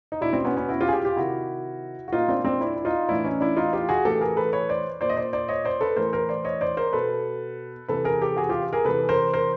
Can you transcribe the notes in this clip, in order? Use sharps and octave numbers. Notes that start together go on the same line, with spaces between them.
D#4
B2 D4 E4
C4 D4
B3 C#4
B3 C#4
E4 F#4
F4 G4
G#4
F4 G4
F4 G4
C3 D#3 E4 F#4
F#4
A#2 D#4 F4
C4 D4
C4 D4
D4 E4
E4
D#4 F4
A2 E3 D4 E4
C#4 D#4
D4 E4
D#4 F4
F4 G4
F#4 G#4
A2 E3 G4 A4
G#4 A#4
A4 B4
B4 C#5
C5 D5
A#2 C5 D5
D#5
C5 D5
C5 D5
C#5 D#5
C5 D5
A4 B4
A2 E3 A#4 C5
A#4 C5
C5 D5
C#5 D#5
C5 D5
A#4 C5
B2 A4 B4
C3 E3 A4 B4
G#4 A#4
G4 A4
F#4 G#4
F4 G4
G#4 A#4
C3 E3 A4 B4
A#4 C5
A#4 C5